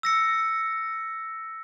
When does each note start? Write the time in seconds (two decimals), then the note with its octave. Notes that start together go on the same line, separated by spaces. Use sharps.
0.03 E6 A#6 C#7